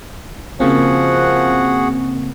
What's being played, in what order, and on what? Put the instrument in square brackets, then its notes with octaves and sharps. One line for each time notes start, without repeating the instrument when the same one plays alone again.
[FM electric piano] C#3 A#3 C4 [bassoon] F3 [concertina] F#4 G#4 F#5